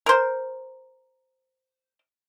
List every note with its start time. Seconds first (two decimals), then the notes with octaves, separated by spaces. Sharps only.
0.06 A#4 C5